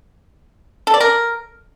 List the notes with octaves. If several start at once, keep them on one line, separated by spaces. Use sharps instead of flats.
A4
D5
A#4